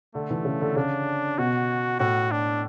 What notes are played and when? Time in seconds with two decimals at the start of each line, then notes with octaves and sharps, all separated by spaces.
0.14 D3 A3
0.31 E3
0.45 C#3
0.61 D3
0.76 C#3 D4
1.38 B2 F#4
1.99 A2 F#4
2.31 D4